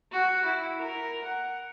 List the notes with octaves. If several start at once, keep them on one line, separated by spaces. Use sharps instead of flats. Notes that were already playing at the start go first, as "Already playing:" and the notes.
F#4
E4
A#4
F#5